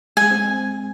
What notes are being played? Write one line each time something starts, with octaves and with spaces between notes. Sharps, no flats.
G#3 G#5
C4